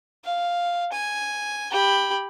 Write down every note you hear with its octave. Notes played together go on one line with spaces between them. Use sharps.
F5
G#5
G4 B5